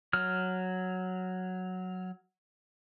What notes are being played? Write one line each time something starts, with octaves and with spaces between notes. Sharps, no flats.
F#3 F6